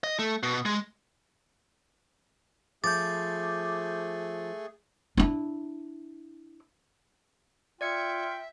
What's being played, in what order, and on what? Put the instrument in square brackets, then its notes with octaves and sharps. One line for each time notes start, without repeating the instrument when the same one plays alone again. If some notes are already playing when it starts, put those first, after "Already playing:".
[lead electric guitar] D#5
A3
B2
G#3
[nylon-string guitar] F3 [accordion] A3 G#4 [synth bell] D6 G6 [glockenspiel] A6
[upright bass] D4 E4
[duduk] F4 [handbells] D5 G#6 C#7 [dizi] E5 [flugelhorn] G5